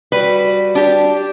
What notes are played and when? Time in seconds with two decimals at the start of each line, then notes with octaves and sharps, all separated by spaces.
0.12 G3 F#4 B4
0.75 D4 G4